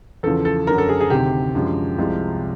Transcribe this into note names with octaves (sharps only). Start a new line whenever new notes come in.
E2 C#3 F3 A4
A4
F#2 D3 F#3 A#4
A4
G#4
G#4
D2 C3 D#3 G4
F#2 D3 F3 G#3
C2 C3 F3 G#3